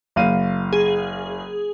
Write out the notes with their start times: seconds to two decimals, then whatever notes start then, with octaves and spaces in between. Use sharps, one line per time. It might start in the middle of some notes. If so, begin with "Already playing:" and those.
0.16 F#1 F5 D#7
0.73 G#4